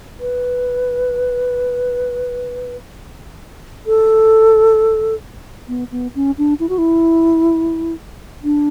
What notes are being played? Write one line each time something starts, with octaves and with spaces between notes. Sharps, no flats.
B4
A4
B3
B3
C#4
D4
E4
F#4
E4
D4